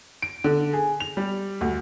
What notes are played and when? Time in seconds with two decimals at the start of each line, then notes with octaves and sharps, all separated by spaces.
0.22 D7
0.44 D3
0.73 G#4
1.00 F7
1.17 G3
1.61 D2